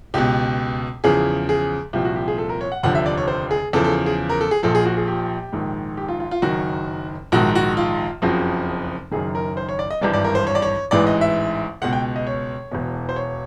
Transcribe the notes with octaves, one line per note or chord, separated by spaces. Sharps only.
C#2 B2 G4
E2 C#3 F3 G#4
G#4
C2 A#2 F3 G4
F#4
G4
G#4
A4
A#4
C#5
F#5
F1 D#2 D3 F3 F#5
E5
D5
C#5
C5
G#4
E2 C#3 F3 A4
A4
G#4
A#4
A4
G#4
A#1 A#2 F3 A4
G#4
F#4
G#4
G4
A#1 G#2 D#3
G4
F4
F4
F4
F#1 F#2 D#3 F#4
A#1 G#2 D#3 F#4
F#4
F4
F#1 F2 C#3 F3 F#4
F#1 F#2 D#3 G#4
A#4
C5
C#5
D5
D#5
G#1 G2 E3 D5
D5
A#4
C5
C#5
D5
C#5
A1 G#2 E3 D5
D#5
E5
C#2 B2 F#5
G5
D#5
C#5
E1 E2 B2
C5
C#5